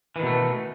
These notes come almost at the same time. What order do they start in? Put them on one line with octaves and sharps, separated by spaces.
E3 D#3 B2 A3